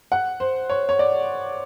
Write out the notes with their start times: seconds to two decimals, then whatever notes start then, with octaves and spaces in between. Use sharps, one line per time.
0.12 F#5
0.40 C5
0.70 C#5
0.89 C#5
0.99 D5